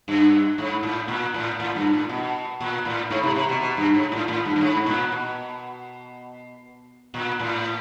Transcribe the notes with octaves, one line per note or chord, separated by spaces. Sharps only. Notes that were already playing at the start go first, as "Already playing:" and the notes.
G2
G#2
A2
A#2
A2
A2
G2
A2
B2
A#2
A2
G#2
C3
C3
B2
B2
G2
G#2
A2
A2
G2
G2
G#2
A#2
B2
A#2
A2